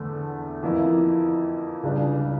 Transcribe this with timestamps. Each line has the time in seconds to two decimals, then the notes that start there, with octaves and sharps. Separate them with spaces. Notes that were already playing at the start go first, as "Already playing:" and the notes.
Already playing: E2 D3 A3
0.63 F2 E3 A#3 E4
1.83 C#2 C#3 G3 D4 G4